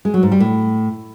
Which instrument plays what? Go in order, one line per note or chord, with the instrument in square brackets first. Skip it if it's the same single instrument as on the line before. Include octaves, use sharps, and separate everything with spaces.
[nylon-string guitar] G#3
F#3
G#2
G3
A2